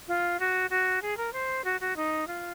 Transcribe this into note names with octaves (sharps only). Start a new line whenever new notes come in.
F4
F#4
F#4
G#4
A#4
C5
F#4
F#4
D#4
F4